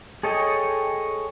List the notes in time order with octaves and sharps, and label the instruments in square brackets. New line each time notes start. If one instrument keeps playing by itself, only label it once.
[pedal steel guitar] G#4 A4 C#5 D#5 G5